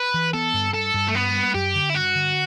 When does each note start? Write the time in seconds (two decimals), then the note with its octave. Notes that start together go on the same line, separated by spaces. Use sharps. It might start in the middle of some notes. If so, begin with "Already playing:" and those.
Already playing: B4
0.14 E3
0.33 B3 A4
0.53 G2
0.74 G2 A4
0.94 G2
1.08 A3
1.15 G3 B3
1.35 G3
1.54 F#2 G4
1.75 D3
1.90 E4
1.95 G2 F#4
2.15 D3